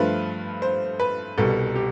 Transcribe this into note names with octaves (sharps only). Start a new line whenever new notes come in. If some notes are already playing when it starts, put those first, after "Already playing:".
Already playing: G2 F3 A3 B4
C5
B4
C2 B2 G3 A4
G4